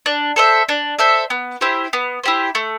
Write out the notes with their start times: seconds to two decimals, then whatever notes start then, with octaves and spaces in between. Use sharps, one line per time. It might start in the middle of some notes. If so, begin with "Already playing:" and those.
0.06 D4
0.36 A4 C5 E5
0.69 D4
0.99 A4 C5 E5
1.30 B3
1.61 E4 G4 C5
1.93 B3
2.24 E4 G4 C5
2.55 A3